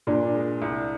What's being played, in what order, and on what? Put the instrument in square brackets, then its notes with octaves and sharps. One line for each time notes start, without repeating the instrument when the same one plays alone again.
[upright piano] A#2 [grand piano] D4
[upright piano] G#3
C2